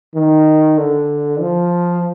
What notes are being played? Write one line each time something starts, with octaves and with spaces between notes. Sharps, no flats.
D#3
D3
F3